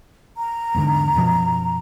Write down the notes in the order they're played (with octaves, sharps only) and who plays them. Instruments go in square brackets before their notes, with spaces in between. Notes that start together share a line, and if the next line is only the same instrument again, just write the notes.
[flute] A#5
[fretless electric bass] E2 G#2 D3
F#2 B2 F3